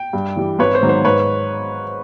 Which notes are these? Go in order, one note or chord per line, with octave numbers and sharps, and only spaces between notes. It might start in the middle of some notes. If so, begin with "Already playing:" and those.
Already playing: G5
G2
E3 G3
G#1 B4 C#5
C5
G#2 D#3 F#3 B3
C5
G#2 B4 C#5